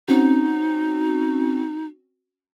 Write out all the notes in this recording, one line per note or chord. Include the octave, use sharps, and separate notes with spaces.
C4 C#4 D#4 F#4